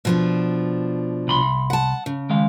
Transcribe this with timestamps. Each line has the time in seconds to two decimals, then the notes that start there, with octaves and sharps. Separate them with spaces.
0.05 B2 F3 D4
1.28 C2 B5 C6
1.70 F#5 A5
2.06 C#3
2.30 D#3 G#3 F5